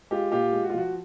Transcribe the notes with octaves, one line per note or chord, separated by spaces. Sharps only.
G#3 F4 G4
A#2 F4 G4
G#3
F#4
F4
F3 F#4